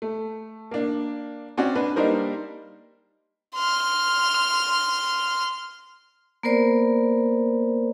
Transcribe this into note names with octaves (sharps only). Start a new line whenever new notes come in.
A3
A#3 D4
C4 C#4 F#4 D5
D4 B4
G3 A#3 D4 D#4 A#4 C5
C6 F6
A#3 B3 A#4 C5 D5